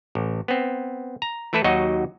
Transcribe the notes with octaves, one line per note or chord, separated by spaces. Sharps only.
A1
B3 C4
A#5
E3 A3 E4 A4 B4
D#2 F#3 D#4 F#4 D#5